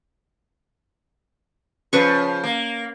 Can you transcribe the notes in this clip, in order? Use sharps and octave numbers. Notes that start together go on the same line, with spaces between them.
C#3 F3 B4 C#6
A#3